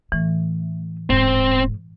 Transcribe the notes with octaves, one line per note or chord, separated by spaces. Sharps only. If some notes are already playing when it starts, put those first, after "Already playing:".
A2 E3 A3
D#1 G#2 C4